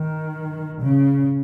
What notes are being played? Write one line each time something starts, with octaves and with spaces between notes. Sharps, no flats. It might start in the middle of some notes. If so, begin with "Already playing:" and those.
Already playing: D#3
C#3